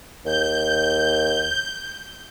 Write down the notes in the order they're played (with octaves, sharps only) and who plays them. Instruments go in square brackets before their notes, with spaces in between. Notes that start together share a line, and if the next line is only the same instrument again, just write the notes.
[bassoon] D#2 [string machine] G6